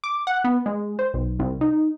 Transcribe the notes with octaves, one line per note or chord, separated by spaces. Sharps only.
D6
F#5
B3
G#3
C5
B1
C2
D#4